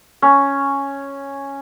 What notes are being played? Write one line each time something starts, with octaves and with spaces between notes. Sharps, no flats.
C#4